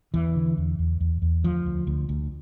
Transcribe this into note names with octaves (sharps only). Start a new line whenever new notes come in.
E2 E3
D3
E2
E2
E2
E2
D2 F3
D2
D2
D2